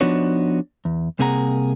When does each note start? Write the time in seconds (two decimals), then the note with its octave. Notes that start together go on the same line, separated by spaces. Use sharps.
0.01 F3 B3 D4 D#4 F#4 C#5
0.85 E2
1.19 C2 C3 A#3 G#4 F#5 A#5